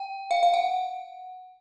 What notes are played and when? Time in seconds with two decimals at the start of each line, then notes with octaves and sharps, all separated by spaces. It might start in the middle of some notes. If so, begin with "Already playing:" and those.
Already playing: G5
0.31 F5
0.43 F5
0.54 F#5